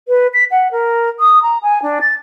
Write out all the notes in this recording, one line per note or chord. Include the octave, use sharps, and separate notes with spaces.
B4
B6
F#5
A#4
D#6
A#5
G#5
D4
A6